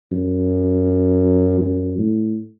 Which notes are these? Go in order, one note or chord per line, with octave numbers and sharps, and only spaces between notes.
F#2
F#2
A2